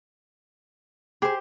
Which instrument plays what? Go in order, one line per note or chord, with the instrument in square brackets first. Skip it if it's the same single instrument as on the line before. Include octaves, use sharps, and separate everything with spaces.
[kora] G4 C5 [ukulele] G#4